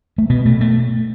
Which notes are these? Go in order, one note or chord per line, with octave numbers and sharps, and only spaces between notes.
A3
B2 B3
B2 A3
A3